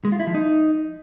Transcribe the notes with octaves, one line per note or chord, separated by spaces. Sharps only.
G#3
F4
E4
F3
D#4